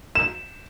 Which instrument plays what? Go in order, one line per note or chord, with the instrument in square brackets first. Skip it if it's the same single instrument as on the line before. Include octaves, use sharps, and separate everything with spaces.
[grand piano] E7